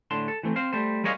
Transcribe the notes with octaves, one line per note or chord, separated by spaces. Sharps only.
A2 D3 A5 C6
A4
E3 A3 C4
C4 C5 F5
G3 A3 C5
G3 G#3 A#4 C#5 D#5 F5